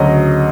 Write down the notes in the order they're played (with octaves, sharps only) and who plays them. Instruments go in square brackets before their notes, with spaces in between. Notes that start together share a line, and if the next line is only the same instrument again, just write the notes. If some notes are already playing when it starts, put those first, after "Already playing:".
Already playing: [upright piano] D2 C#3 F#3 D#5